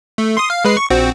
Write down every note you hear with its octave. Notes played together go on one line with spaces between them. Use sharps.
A3
C6 D#6
F5
G#3 B4 C7
C#6
A#1 C4 F#4